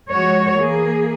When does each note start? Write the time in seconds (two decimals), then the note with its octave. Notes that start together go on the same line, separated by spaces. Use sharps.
0.11 F3 G#3 F#4 C#5
0.57 E3 A#3 G#4